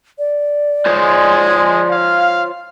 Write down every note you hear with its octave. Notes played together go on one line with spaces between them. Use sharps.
D5
G#3 F4 C5 C#5
F5